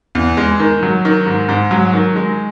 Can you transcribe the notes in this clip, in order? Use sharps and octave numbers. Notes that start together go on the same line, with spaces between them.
E2
G#3
D#3
F#3
D#3
G#2
G#2
F#3
D#3
G#3